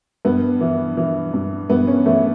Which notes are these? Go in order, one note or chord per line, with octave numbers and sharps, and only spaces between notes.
G2 B3
E3
E3
G2
G2 B3
C#4
E3 A3